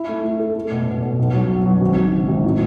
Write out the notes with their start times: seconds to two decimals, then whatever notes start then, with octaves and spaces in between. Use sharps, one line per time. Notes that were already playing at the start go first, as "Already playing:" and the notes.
Already playing: E4
0.09 A3
0.24 E4
0.39 A4
0.56 A3
0.71 B2
0.87 B2
1.02 B2
1.19 B1
1.33 F#3
1.50 B2
1.66 F#3
1.81 G#1
1.96 G#1
2.12 G#1
2.28 G#1
2.44 A2